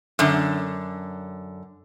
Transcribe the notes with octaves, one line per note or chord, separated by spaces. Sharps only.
F#2 D3